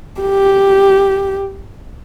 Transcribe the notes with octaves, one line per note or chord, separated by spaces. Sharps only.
G4